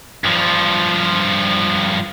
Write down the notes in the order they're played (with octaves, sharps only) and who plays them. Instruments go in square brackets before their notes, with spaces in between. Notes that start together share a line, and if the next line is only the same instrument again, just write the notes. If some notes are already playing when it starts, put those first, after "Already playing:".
[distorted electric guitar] G2 F3